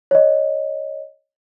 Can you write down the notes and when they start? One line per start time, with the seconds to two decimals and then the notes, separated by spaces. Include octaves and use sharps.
0.11 C#5 D#5